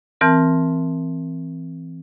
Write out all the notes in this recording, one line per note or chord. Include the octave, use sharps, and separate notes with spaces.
E3 C4 A#4 A5 F6